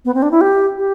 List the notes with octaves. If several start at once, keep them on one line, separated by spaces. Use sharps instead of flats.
B3
C4
D4
E4
G4
G4